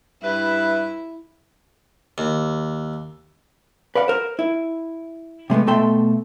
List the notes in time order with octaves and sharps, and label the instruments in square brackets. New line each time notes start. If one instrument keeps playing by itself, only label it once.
[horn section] G2 B4 E5 [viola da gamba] E4
[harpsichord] D#2
[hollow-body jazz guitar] B4 D5 F5 F#5
A#4 C5
E4
C3 G#3 A3 B3
B2 A3 A4 E5 G5 C6